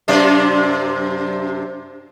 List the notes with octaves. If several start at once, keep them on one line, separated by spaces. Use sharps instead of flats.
F#2 C3 D4